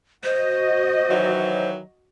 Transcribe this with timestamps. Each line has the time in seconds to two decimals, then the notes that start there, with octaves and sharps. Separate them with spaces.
0.24 F#4 C5 D#5
1.10 D#3 E3 F#3